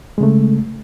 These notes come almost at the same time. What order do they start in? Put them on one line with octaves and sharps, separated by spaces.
G#3 C#3 A3